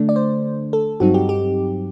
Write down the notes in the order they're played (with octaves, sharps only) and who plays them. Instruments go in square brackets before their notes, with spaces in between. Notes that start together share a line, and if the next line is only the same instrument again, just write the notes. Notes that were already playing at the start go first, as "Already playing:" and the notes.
Already playing: [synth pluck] D3 A3 D4
D5
C5
A4
G2 F#3 C4 D#4 F#4
G4
G4